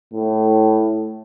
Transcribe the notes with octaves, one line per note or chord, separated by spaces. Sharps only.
A2